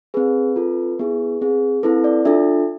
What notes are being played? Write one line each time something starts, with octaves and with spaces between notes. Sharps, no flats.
C4 G#4 B4
C4 F4 A4
B3 E4 G#4
C4 G#4
C4 E4 A4 B4
D5
D4 F4 A4 E5